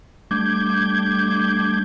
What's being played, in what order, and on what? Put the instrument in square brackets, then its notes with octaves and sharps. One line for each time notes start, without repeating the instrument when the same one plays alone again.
[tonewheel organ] G3 A3 D4 D6 G6 G#6